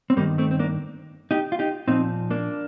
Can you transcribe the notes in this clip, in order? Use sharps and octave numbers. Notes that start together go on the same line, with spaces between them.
C4
G2 D#3 G3 A#3
A3 C4
C4
A#3 D4
D#4 G4
F4
D#4 G4
A#2 F3 C4 D#4
A#3 D4